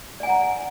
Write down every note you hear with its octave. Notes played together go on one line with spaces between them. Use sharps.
D5 F#5 G#5 A#5